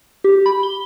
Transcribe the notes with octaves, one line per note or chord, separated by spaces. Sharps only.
G4
B5
G7